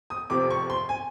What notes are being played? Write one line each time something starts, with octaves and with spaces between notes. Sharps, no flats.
D#6
F1 F2 C3 D6
C#6
C6
G#5